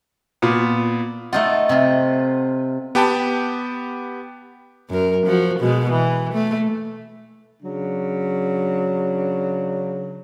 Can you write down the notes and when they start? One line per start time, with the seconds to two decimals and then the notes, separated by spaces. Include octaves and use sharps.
0.42 A#2 B3
1.33 A3 D#4 F4 F#5
1.69 C3 F4
2.95 B3 G4 G5 A5 B5
4.90 F#2 A#4
5.26 F3 F#4
5.59 B2 G#3
5.91 E3
6.33 A3
7.62 C#3 F#3 D4